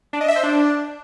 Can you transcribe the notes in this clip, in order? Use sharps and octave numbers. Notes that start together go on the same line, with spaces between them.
D4
D#5
E5
C5
D4